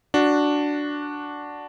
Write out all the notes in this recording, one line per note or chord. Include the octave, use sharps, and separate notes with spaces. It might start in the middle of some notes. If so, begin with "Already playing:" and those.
D4 F#4